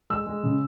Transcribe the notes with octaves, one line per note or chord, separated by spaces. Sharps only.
G#3 E6
G#3
C#3